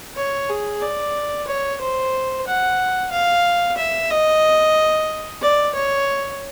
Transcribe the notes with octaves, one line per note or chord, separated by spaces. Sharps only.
C#5
G#4
D5
C#5
C5
F#5
F5
E5
D#5
D5
C#5